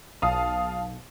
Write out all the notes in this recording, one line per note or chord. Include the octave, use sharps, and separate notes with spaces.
B1 F5 A5 D#6